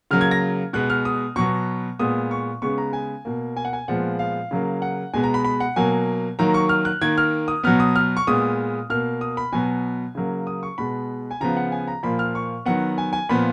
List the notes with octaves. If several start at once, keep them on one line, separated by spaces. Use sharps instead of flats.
C#3 F#3 A#3 F6
G#6
A#6
B2 G#3 B3 F#6
F6
D#6
B2 F#3 B3 C#6
A#2 G#3 B3 D#6
C#6
C#3 G#3 B3 C#6
A#5
G#5
B2 A#3
G#5
F#5
G#5
A#2 F3 G#3 B3 F#5
F5
C#3 F#3 A#3
F#5
B2 G#3 B3 G#5
A#5
B5
B5
F#5
B2 F#3 A#3 G#5
D#3 F#3 A#3 A#5
C#6
F6
F#6
D#3 A#3 G#6
F6
D#6
B2 F#3 B3 F6
D#6
F6
C#6
A#2 G#3 B3 D#6
B2 A#3 F6
D#6
B5
B2 F#3 B3 G#5
C#3 F#3 A#3
D#6
C#6
B2 G#3 B3 B5
G#5
C#3 F3 B3 A#5
F#5
G#5
A#5
A#2 F3 A#3 B5
F6
C#6
D#3 F#3 B3 F#5
G#5
G#5
A#2 F3 B3 B5